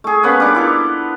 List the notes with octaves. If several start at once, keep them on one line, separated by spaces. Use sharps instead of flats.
A3 G#4
A#3 B3 C#4 B4
G3 D4 D6
E4 F4 A4